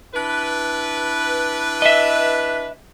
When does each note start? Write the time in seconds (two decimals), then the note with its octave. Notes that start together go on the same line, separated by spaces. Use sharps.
0.14 D4 E4 B4
1.82 D#5 E5